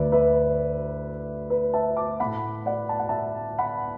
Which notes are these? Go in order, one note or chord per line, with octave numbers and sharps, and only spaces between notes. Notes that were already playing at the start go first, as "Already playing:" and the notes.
Already playing: D2 D3 A3 B4 D5 E5
B4 E5
B4
E5 A5
A5 D6
A2 A3 F#5 B5
D5 F#5
A5
F#5
E5 A5
F#5 B5